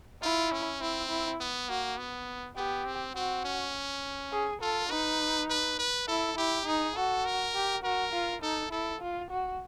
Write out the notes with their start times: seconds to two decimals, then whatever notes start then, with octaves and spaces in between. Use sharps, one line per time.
0.22 E4 F4
0.52 C#4
0.81 C4 E4
1.09 E4
1.40 B3
1.69 A#3 F#4
1.98 B3
2.56 B3 G4
2.86 C4
3.15 C4 F#4
3.45 C#4
4.33 G#4
4.61 F4 A4
4.90 D#4 B4
5.50 B4
5.79 B4
6.07 E4 A4
6.37 E4 G4
6.66 D#4 G#4
6.96 F#4 A4
7.26 A#4
7.55 G4
7.83 F#4 A#4
8.13 F4
8.42 D#4 A4
8.71 E4 A4
9.01 F4
9.31 F#4